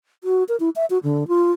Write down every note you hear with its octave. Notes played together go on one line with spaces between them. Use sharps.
F#4
A#4
E4
E5
F#4
D3
F4